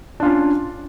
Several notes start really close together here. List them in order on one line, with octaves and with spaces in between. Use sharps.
D4 F4 C#4